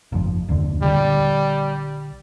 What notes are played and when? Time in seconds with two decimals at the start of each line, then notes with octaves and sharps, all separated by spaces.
0.12 G1 F2 F3
0.49 F#1 D#2 D3
0.82 A#1 D3 G3